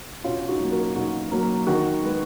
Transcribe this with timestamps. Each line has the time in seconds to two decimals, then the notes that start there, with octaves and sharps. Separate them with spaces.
0.24 B2 C#4 F4
0.48 D#4 F#4
0.60 F#3 A#3
0.72 F#4 A#4
0.96 B2 D#4 F#4
1.31 F#3 A#3
1.67 D#3 F#4 A#4
2.03 G#3 B3